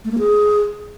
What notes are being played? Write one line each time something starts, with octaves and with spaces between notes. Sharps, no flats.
A3
A#3
G#4